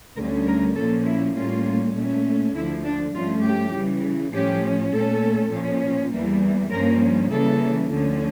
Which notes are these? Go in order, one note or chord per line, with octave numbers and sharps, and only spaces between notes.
D2 D3 G3 C#4 A#4
A#4
A#2 F3 A#3 C#4 A4
E4
A2 G3 A#3 C#4 F4
A#2 A3 C#4
D2 D3 F3 E4
D4
G2 F3 A3 C#4 F4
G4
C#3 E3 G3
A2 F3 C#4 G4
A#2 A3 C#4 A4
A#2 F3 C#4
E2 E3 G3 A#3
G2 F3 A#3 C#4 A#4
C#3 E3 G3 A#3 C#4 A4
D2 D3 F3 C#4